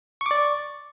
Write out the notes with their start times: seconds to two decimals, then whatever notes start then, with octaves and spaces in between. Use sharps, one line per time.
0.21 C#6
0.26 D6
0.31 D5